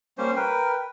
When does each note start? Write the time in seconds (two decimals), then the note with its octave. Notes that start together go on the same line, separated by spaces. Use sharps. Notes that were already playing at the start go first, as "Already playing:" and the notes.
0.18 G3 A#3 C#4 C5
0.36 A#4 B4 G5